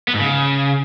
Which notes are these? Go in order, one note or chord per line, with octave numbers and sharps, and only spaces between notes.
B3
G#2
C#3